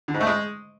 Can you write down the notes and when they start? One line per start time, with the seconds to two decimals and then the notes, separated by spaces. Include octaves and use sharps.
0.08 D3
0.14 G#2
0.20 A3
0.27 G#3